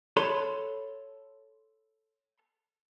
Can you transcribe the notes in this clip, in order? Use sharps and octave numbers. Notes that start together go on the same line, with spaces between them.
A4 C#5 B5 C6